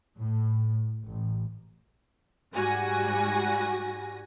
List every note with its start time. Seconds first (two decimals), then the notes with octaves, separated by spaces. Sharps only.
0.18 A2
1.04 A1
2.53 G#2 G3 F#4 G#5 A#6